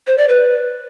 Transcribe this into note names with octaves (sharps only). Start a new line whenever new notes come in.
C5
D5
B4